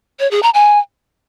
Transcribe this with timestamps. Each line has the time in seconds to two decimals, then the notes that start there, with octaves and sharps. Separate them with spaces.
0.20 C#5
0.31 G#4
0.43 A#5
0.54 G#5